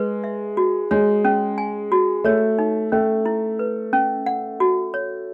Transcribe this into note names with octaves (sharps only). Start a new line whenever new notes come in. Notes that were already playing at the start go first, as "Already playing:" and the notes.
Already playing: G#3 B4
E5
F#4
G#3 C#5
C#4
G#5
F#4
A3 C#5
D#4
A3 C#4
E4
B4
C#4
F#5
F#4
C#5